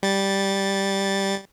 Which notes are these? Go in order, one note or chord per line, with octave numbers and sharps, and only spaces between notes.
G3 A6